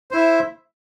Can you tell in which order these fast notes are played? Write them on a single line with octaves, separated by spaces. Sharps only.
C5 E4 E5